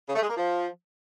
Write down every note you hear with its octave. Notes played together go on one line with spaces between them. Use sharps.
C#3
A3
G#3
A#3
F3